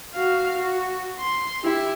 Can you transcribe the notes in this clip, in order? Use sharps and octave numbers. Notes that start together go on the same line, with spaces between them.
F#4 F5
F#4
C6
E4 G4